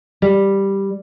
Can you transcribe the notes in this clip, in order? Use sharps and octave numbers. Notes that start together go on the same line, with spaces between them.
G3